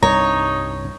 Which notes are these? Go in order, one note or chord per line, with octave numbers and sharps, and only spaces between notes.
C2 G2 D#4 C#5 A#5